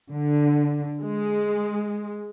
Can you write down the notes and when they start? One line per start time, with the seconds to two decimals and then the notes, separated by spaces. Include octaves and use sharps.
0.11 D3
1.02 G#3